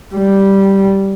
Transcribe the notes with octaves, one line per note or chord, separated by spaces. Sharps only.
G3